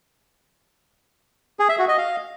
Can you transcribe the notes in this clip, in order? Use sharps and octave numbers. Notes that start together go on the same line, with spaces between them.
G#4
E5
F#4
D#5
F5